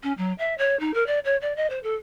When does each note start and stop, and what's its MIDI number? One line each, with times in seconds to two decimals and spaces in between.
0.03 0.13 61
0.18 0.33 54
0.39 0.54 76
0.58 0.78 73
0.80 0.94 63
0.94 1.06 70
1.06 1.19 74
1.25 1.36 73
1.41 1.55 74
1.56 1.69 75
1.70 1.79 72
1.83 1.95 69